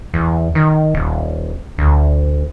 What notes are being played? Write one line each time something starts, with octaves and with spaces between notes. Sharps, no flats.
E2
D#3
D#1
D2